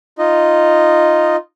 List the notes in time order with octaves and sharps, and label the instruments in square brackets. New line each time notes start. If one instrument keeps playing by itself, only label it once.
[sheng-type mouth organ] D#4 F4 D#5